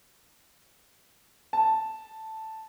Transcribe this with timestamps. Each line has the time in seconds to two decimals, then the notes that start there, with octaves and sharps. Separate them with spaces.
1.53 A5